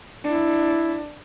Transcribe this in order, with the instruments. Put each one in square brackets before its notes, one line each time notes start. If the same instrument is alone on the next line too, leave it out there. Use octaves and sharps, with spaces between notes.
[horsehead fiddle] D4 [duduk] E4